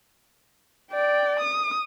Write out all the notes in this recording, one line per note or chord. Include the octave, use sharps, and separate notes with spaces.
D5 G5
D#6